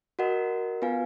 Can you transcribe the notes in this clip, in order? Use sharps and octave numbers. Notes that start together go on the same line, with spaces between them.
F#4 A#4 D#5 F#5
B3 F4 B4 F5 G#5